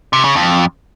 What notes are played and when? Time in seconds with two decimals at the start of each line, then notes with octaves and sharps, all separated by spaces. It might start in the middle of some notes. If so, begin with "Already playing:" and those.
0.13 C3
0.24 C#3
0.36 F2